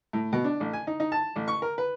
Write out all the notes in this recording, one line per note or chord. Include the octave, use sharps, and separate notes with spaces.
A2
B2
D4
A1
G#5
D#4
D#4
A5
A1
C#6
A#4
B4